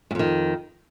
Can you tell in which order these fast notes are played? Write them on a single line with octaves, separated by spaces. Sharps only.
G#2 F2 D#3